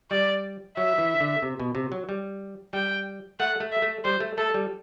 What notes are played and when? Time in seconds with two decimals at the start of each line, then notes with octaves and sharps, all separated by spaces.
0.11 G3 D5
0.76 F#3 E5
0.98 E3
1.20 D3
1.42 C3
1.60 B2
1.75 C3
1.92 F#3
2.09 G3
2.73 G3 G5
3.39 A3 F#5
3.60 A3
3.72 E5
3.82 A3
4.04 G3 C5
4.20 A3
4.38 A3 A4
4.54 G3